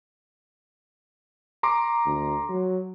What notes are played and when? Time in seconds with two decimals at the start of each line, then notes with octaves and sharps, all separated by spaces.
1.63 A#5 C6 D6
2.05 D2
2.49 F#3